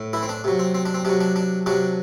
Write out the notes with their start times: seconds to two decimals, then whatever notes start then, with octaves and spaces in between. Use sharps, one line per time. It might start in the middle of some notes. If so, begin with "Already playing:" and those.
Already playing: A2
0.13 E3 E4
0.23 C4
0.29 D4
0.44 C3 F#3
0.59 C4
0.75 C4
0.85 D4
0.94 C4
1.05 C3 F#3 D4
1.21 D4
1.36 D4
1.66 C3 F#3 D4